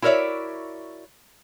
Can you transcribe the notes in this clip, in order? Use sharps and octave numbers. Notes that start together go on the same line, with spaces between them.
E4 F#4 A#4 C#5 D5 E5